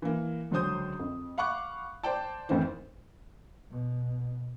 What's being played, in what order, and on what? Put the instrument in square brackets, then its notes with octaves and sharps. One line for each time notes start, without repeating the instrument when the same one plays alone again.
[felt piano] E3 A#3
C#2 D3 F#3 C5 D#6 G6
F2
F5 F#5 B5 C#6 D6 F#6
C5 D5 G5 A5
F2 A2 D#3 E3 C5
[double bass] B2